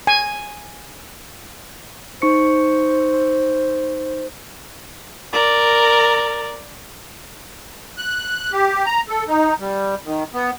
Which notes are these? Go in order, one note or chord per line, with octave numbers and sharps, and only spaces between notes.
G#5
D#4 C5 C#6 C#7
A#4 D5
F#6
G4
A#5
A4
D#4
G3
D#3
B3